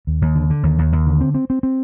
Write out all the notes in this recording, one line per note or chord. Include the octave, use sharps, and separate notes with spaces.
D#2
D#2
D3
D3
D#2
D#2
D#2
D3
C4
C4
C4
C4